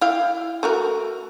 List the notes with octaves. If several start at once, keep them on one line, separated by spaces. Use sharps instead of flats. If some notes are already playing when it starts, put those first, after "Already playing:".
E4 F5 G5
A3 F#4 A#4